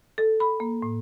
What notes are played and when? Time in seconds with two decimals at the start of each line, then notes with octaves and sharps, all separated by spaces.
0.18 A4
0.40 B5
0.60 A#3
0.82 A2